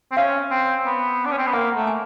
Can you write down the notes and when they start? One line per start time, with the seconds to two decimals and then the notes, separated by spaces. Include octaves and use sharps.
0.11 C4
0.17 C#4 F5
0.51 C4
0.86 B3
1.25 D4
1.32 C#4
1.38 C4
1.47 B3
1.53 A#3 F#5
1.75 A3
1.87 G#5